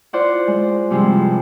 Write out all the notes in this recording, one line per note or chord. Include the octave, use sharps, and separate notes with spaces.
E4 F4 C5 D5 F#5
G#3
G2 C3 F3 G#3 E4